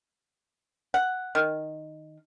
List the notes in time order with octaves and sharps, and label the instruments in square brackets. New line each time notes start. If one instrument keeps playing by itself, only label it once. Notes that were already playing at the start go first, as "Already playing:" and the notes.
[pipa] F#5
D#3